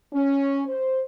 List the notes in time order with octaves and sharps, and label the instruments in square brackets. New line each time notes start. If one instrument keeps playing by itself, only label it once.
[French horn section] C#4
C5